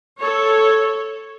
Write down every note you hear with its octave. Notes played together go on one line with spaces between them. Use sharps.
A4 C#5